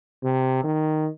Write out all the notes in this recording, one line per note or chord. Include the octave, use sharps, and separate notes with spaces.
C3
D#3